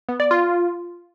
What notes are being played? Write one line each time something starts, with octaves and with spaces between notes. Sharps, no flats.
B3
D5
F4